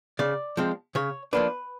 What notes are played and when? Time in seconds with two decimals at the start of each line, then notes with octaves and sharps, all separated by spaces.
0.19 C#3 D5
0.57 F3 G#3 C4
0.95 C#3 C#5
1.33 F3 A#3 D4 B4